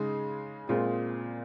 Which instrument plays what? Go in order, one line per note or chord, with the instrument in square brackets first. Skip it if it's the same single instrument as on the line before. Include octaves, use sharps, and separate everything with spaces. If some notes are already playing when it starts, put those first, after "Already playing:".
Already playing: [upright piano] C#3 G#3 D#4 G#4
A#2 G#3 C4 F4 G#4